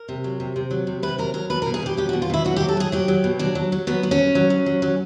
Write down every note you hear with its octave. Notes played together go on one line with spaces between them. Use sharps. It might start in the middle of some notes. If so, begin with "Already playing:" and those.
Already playing: A#4
C3
F#3
C3
C3
F#3
C3
C3 B4
F#3 A#4
F#3 A#4
B2 B4
A#4
B2
G#4
B2 G4
F#3 G4
F#4
B2
F4
B2 E4
F#3 F#4
G4
F#3
A4
F#3 G#4
F#3 G4
F#3
B2
F#3 D4
F#3
F#3
F#3 B3
F#3
C#4
F#3
F#3
F#3
F#3
F#3